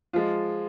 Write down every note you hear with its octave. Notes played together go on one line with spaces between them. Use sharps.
F3 G#3 F4